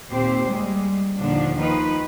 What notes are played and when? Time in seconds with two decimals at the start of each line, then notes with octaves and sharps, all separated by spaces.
0.11 D#2 A#2 C4 G4 C5
0.47 G3 G#3
1.18 D#2 A#2 D3 F3 D4
1.57 D#3 F3 D#4 B4